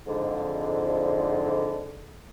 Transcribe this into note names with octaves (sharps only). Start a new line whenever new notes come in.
F2 G#2 D3